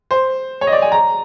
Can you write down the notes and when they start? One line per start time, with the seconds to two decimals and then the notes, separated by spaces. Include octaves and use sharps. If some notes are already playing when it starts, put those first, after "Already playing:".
0.11 C5
0.61 C#5
0.67 D#5
0.72 D5
0.82 G#5
0.92 A#5